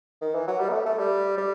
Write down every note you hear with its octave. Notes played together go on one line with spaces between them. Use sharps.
D#3
E3
F#3
G3
B3
A3
A3
G3
G3